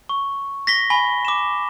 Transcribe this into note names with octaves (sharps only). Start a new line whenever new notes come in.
C#6
A#6 B6 G7
G#5 B5 G7
D6 E7